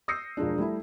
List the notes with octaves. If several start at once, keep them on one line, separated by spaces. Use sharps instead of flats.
D#6 E6 G6 A#6 C7 C#7
E1 F3 G#3 D4
G3 A3 E4